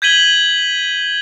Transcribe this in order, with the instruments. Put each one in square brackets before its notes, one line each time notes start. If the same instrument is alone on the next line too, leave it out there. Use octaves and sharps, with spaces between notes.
[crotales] G6 G#6 B6 D#7 F#7 G7